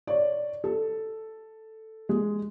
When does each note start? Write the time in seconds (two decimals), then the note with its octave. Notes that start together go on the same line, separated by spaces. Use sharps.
0.07 C#5 D5
0.64 A4
2.09 G#3